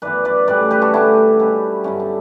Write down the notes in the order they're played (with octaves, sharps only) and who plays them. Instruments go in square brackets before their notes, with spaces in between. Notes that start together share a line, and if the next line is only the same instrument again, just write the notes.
[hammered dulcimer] F#2 E3 B3 B4 D5
B4 D5
A2 G3 C#4 B4 D5
G4 B4
F#4 A4
D3 A3 C#4 E4 G4
B2 G3 C#4
G2 D3 F#3 C#4 E4
D4